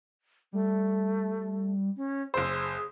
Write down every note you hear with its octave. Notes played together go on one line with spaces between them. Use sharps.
G3 A3
C#4
F#1 G#4 C5 E6